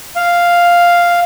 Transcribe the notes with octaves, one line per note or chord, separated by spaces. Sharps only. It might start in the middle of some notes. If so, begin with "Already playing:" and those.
F5